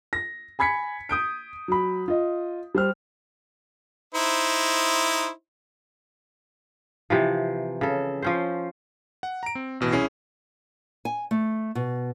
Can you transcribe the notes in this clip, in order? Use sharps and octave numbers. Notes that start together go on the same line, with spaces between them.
A#6
G#5 B5 G#6 B6 C#7
D#6 G6 D7
F#3 B5
F4 D#5
G3 C5 F6
D#4 E4 C5
C3 E3 F3
C#3 A4
F3 C#4 C5
F#5
A#5 D7
C4
A1 B2 E3
C2 C#4 E4 G#4 C7
G#5
A3
B2